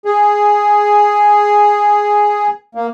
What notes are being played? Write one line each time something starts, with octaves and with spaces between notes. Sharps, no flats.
G#4
A#3